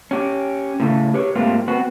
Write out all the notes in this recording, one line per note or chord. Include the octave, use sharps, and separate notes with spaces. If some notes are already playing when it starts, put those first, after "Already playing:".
C#4 G4
A2 C#3 A3
G4 B4 C#5
G#2 A3 A#3 C4 F4 G4
B3 C4 F#4